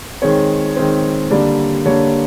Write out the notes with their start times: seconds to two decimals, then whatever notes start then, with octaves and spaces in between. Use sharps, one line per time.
0.22 D#3 G#3 C4 C#5
0.76 D#3 G#3 C4
1.31 D3 G3 A#3 D5
1.85 D3 G3 A#3 C#5